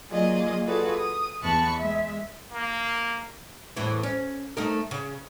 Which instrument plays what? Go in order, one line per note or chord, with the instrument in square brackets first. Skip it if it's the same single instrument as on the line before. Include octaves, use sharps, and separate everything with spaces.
[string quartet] F#3 A#3 F4 G#4 D5 D#5
F4 F#4 G#4 A4 B4 D5
D#6
E2 B3 A5 B5 C#6 F#6
G#3 E5
[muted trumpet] A#3
[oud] E2 A2 E3
C#4
A3 D#4 A#4
C#3